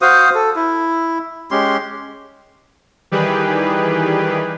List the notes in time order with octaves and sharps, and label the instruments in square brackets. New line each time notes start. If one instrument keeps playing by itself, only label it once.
[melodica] F#4 C5 F5 D#6
A4
E4
G#3 C#4 G4 C6
[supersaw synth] D#3 E3 G3 G4 G#4 B4